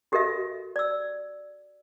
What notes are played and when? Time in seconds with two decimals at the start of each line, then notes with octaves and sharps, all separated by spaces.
0.12 F#4 G4 A4 A#4 D#5 E5
0.76 D5 E6